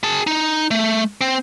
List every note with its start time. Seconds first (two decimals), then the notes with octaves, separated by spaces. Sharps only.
0.04 G#4 A5
0.27 D#4
0.71 A3
1.21 C4